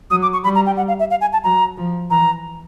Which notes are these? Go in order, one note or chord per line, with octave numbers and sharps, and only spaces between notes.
F#3 D#6
D6
C#6
G3 B5
A#5
G5
F#5
F5
E5
F5
G#5
A5
F#3 A#5
F3
E3 A#5